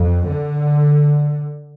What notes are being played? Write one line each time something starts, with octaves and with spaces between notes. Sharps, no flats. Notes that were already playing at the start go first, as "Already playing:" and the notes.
Already playing: F2
D3